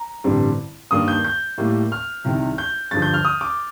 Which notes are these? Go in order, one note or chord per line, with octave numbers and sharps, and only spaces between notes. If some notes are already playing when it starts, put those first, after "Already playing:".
Already playing: A#5
A1 G2 D3 G3 C4
G2 D#3 A#3 D4 D#6
G6
G6
A2 G3 A#3
F6
C2 C3 D#3
G6
G2 D3 F3 A6
G6
F6
D#6
D6